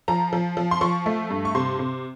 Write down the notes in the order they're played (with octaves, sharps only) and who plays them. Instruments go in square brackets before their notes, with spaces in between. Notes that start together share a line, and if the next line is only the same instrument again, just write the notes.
[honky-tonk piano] F3 A#5
F3
F3
C6
F3 C#6
A3
G2
C#6
C3 C6
C3